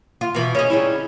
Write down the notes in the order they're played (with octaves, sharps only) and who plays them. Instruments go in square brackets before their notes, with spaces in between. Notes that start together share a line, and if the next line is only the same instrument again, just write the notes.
[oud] F4
B2 E3
[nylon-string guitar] C#3 [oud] C#4 D#4
[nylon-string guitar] C#3 G3 E4